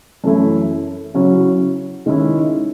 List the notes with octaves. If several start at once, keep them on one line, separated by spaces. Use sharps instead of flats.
F#2 E3 A3 E4
C#3 F#3 C#4 E4
D#3 G#3 C#4 E4